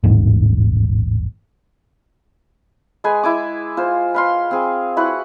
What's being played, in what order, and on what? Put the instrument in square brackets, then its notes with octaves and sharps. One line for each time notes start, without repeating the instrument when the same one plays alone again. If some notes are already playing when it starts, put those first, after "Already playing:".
[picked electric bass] D#1 A1 G#2
[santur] G#3 G#4 B4 G#5
E4 G#5 D6
F4 C5
B4 F5 C6
C4 G#4
E4 F#4 B4 F#5